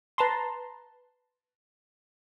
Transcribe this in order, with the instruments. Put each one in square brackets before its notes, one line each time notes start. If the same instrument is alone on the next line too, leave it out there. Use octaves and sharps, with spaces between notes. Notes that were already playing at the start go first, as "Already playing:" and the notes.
[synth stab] B4 A5 A#5 C6